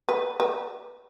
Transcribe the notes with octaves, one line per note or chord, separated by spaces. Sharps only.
B4
B4